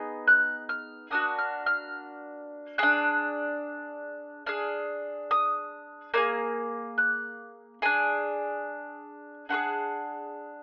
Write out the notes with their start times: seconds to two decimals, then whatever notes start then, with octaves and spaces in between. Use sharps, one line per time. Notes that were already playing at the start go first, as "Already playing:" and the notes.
Already playing: B3 D#4 G#4
0.28 F#6
0.69 F6
1.11 A#3 D4 F#4 D#6
1.39 F6
1.66 F6
2.78 D4 G#4 F#6
4.46 D4 G#4 F6
5.31 D#6
6.14 A#3 D4 G#4
6.98 F#6
7.82 D4 G#4 G#5
9.49 D4 F4 G#4 F#5